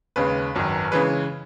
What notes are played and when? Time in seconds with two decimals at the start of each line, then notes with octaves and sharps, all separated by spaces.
0.16 D#2 C#3 G#3 B4
0.55 G#1 F#2 D#3
0.92 C#3 E3 G#3 B4